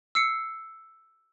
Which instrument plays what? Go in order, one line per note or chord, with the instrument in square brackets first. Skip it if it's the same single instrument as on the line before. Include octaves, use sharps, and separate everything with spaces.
[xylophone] E6 C7 C#7